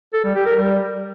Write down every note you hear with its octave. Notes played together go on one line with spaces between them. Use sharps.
A4
G3
G4
A#4
G3